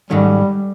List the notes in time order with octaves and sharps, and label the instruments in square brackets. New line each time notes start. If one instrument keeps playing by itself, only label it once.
[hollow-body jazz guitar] G#2 D#3 F#3 A3 C#4 [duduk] G3